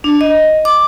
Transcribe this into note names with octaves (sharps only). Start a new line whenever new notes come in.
D4
D#5
D6